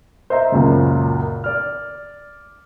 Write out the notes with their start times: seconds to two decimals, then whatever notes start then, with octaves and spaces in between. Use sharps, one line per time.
0.30 C5 D#5 E5 A#5
0.52 C#2 F#2 A#2 C#3
1.44 D5 F6